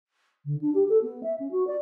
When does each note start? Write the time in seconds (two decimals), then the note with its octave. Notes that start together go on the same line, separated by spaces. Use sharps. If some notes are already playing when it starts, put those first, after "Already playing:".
0.45 D3
0.61 D4
0.74 G4
0.89 A4
1.02 B3
1.23 E5
1.39 C#4
1.51 F#4
1.67 D5